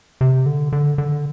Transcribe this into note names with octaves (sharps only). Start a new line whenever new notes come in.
C3
D3
D3
D3